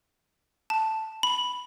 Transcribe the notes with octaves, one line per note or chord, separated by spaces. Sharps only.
A5
B5